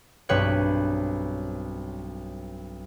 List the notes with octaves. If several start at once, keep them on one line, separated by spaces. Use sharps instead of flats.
B1 G2 C4 B4 C#5